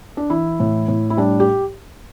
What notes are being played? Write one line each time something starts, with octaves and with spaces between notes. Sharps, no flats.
D4
E3 E4
A2
A2
E4
G3 D4
G4